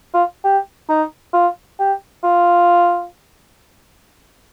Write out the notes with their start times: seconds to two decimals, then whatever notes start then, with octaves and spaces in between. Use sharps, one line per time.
0.14 F4
0.44 G4
0.89 D#4
1.34 F4
1.79 G4
2.24 F4